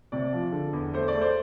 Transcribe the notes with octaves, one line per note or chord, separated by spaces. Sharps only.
C3 D5
F3
D3
E2
A3 C5
D5
A3
C5